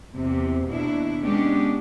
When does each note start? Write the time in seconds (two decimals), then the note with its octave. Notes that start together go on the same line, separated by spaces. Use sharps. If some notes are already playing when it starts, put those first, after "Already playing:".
0.13 E2 C3
0.66 D#2 B2 D4 E4
1.24 G#3 B3 C#4 D4 G4